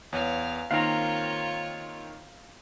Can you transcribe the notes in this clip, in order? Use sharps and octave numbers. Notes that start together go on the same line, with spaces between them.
E2 C#5 F5
D#3 A#3 C4 F4 C#5 F5 A#5